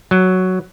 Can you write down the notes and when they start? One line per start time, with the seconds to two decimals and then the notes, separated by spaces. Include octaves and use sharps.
0.11 F#3